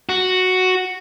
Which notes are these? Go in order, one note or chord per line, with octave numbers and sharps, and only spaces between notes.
F#4